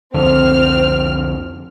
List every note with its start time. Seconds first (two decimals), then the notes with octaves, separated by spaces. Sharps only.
0.14 C2 F2 D3 C4 F6